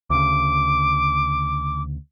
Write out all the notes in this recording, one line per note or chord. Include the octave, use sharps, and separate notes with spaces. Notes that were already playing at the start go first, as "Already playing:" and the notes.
D2 C#3 D6